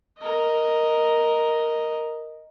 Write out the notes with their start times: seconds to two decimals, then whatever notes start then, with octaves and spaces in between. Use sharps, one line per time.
0.19 A#4 D#5